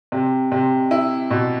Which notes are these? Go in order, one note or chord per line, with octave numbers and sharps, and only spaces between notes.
C3
C3
E4
B2